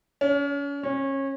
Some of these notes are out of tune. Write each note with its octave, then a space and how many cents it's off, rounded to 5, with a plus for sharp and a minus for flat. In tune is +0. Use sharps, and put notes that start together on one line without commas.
C#4 +35
C#4 -25